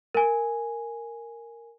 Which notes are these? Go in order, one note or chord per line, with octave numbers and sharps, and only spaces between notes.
A#4 G#5